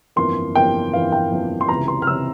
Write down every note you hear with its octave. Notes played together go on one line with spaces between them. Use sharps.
G1 F2 E3 A#3 C6
G1 F2 E3 A#3 G5
G1 F2 E3 A#3 F5
G5
G1 F2 E3 A#3
C6
C#2 C3 E3 A#5
C6
F6
C#2 C3 E3 E6